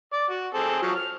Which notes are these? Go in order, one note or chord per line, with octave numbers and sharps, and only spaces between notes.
D5
F#4
C4 G#4 A4
F3 F#3
F6